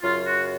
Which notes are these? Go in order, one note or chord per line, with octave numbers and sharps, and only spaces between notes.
F#2 C#3 F#3 F4
F#4